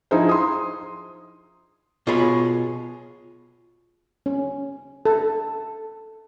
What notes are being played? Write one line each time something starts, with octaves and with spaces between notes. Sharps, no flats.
F3 D#4 E4 G#4 C5
C6 D#6
B2 F4 G#4 C#5 B5
C#4
A4